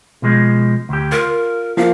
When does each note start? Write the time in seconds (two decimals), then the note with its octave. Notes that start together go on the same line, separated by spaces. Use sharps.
0.22 B2 F3 G#3
0.89 D2 G4
1.12 F4 A#4
1.77 F3 A#3 F5